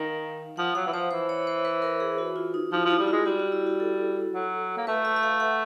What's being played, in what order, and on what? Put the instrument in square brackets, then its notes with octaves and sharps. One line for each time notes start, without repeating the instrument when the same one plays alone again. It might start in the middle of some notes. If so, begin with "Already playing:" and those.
Already playing: [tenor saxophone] D#3 [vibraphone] F5
[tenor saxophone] F3 [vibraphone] F#5
[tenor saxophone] F#3 [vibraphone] F5
[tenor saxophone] E3
[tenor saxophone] F3 [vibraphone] C5
[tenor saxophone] E3 [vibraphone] C5
[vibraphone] C#5
C5
B4
A#4
G#4
F#4
F4
D#4
[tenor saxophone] F3 [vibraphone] E4
[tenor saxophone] F3
[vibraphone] E4
[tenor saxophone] G3 [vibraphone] F#4
[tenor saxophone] G#3 [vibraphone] F4
[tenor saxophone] G3 [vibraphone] F#4
[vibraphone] F#4
E4
F#4
A4
[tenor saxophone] F#3
A#3
[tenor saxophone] A3 [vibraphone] B4
[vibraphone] E5
E5
F5
F#5